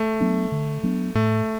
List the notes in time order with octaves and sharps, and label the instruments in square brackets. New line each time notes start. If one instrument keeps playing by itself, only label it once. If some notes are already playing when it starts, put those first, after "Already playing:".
Already playing: [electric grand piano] A3
[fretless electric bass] F#3 B3 D4
D3
F#3 B3 D4
[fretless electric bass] A2 [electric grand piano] A3